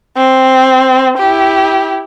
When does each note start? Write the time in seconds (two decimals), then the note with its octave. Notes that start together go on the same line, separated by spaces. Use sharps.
0.17 C4
1.18 E4 G4